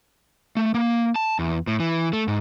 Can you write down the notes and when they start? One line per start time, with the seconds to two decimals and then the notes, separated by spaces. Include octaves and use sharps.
0.57 A3
0.75 A#3
1.16 A5
1.39 E2
1.67 A2
1.80 E3
2.13 A3
2.28 G#2